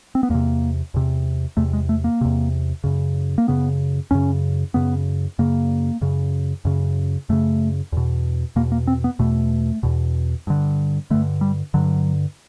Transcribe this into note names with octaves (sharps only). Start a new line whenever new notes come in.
C4
B3
E2 C3 A#3
E2 C3
E2 C3 A3
G#3
A3
A#3
E2 C3
F#2 C#3
A#3
F#2 C#3 B3
F#2 C#3 C#4
F#2 C#3 B3
F#2 C#3 A#3
F#2 C#3
F#2 C#3
F#2 C#3 A3
E2 B2
E2 B2 A#3
A#3
C4
B3
E2 B2 A3
E2 B2
G2 D3
G2 D3 A3
G3
G2 D3 F#3